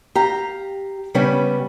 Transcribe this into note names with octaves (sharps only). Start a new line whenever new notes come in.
G4 F5 A#5
C#3 G3 B3 C#4 G4